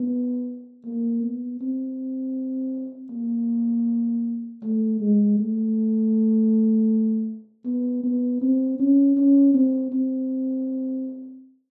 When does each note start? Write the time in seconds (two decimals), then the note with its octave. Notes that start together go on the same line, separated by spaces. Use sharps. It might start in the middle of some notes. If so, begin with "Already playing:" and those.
Already playing: B3
0.85 A#3
1.23 B3
1.61 C4
3.11 A#3
4.63 A3
5.01 G#3
5.39 A3
7.65 B3
8.04 B3
8.41 C4
8.79 C#4
9.17 C#4
9.54 C4
9.92 C4